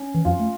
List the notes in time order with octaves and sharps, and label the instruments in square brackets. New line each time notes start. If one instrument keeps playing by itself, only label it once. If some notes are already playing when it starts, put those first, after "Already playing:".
Already playing: [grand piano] C#4
[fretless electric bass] E3
[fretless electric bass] F2 F3 [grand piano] F4
[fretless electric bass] A3